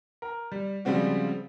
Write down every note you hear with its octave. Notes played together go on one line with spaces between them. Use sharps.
A#4
G3
C#3 F3 G3 G#3 C4 F#4